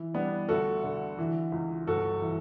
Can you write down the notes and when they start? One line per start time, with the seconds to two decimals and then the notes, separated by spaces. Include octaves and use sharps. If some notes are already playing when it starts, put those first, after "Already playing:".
Already playing: E3
0.14 G3 B3 D4
0.49 D2 F#4 A4
0.83 D3
1.18 E3
1.52 C#2
1.87 G1 F#4 A4
2.22 E3